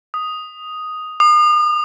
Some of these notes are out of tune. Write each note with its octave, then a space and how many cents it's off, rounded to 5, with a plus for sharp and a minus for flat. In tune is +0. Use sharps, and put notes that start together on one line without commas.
D#6 +0
D#6 -40